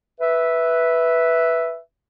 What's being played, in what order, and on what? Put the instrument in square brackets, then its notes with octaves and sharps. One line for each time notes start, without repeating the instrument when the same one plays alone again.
[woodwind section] B4 E5